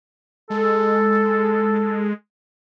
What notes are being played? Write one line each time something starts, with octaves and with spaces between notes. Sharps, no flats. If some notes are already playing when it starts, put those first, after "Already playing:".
G#3 A4